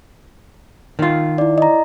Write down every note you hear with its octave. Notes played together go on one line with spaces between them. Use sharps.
D#3 F4
E4 D5
D#5 A#5